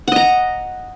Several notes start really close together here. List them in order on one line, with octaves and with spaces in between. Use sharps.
F#5 D#5 A#5